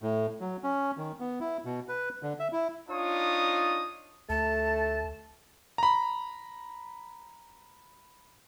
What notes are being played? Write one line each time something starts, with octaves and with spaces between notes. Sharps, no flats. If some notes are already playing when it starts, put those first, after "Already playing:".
A2
F#3
C#4
D#3
B3
E4
B2
B4
D3
E5
E4
D4 D#4 F4 C#5 D#6
D2 A3 A5 A6
A#5 B5